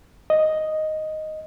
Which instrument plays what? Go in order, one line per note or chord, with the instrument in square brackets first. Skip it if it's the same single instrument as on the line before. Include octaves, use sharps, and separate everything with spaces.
[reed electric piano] D#5